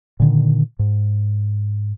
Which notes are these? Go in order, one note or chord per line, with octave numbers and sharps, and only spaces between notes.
A#2 D3 D#3
G#2